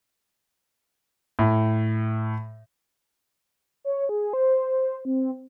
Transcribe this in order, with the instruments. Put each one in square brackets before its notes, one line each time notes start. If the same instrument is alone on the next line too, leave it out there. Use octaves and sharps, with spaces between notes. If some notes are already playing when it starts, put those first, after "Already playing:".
[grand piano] A2
[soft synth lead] C#5
G#4
C5
C4